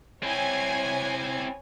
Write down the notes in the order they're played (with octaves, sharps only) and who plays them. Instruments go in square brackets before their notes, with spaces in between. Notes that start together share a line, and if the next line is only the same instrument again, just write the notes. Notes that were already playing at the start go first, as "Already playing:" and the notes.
[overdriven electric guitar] C4 E4 [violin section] C#5 G#5